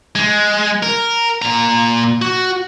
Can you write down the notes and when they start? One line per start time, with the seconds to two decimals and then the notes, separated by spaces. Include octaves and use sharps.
0.15 G#3
0.83 A#4
1.42 A#2 A#5
2.22 F#4